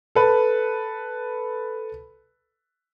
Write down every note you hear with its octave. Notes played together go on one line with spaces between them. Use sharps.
A4 B4